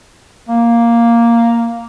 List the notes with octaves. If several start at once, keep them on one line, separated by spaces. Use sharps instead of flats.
A#3